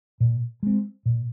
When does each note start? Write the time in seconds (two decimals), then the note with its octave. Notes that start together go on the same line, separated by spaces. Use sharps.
0.20 A#2
0.63 G#3 C4
1.06 A#2